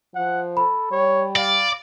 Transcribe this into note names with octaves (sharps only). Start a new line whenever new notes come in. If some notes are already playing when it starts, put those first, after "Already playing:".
F3 F#5
A4 B5
G3 C#5
D5 F5